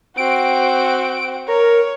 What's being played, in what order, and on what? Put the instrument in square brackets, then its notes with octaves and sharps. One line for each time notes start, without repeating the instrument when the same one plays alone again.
[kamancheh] C4 F#4 [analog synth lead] D7
[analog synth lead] A#4 [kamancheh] C#5